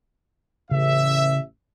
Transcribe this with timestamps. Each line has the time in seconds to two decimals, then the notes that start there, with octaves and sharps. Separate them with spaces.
0.71 A1 C#3 E5